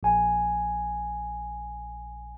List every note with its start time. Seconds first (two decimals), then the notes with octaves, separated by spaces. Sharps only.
0.03 A#1 G#5